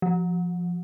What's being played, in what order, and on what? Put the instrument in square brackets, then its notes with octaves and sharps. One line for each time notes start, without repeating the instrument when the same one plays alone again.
[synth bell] F3